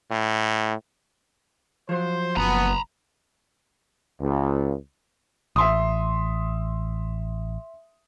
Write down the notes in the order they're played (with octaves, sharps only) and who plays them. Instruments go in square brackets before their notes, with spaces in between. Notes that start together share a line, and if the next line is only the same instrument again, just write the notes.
[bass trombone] A2
[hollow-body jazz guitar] F3 F#3 [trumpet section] C5
[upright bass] F#1 [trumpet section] B3 [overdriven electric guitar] A#5 B5
[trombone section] C#2
[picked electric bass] A1 [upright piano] E5 C6 D#6